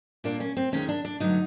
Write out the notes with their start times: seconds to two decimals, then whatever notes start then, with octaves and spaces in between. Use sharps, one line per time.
0.24 A#2 G3 A#3 D4
0.40 C#4
0.57 C4
0.72 D#2 D#3 G#3 C#4
0.89 D4
1.05 D4
1.20 G2 D3 F#3 A3 D#4